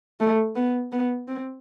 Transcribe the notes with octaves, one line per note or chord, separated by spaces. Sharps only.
A3
B3
B3
C4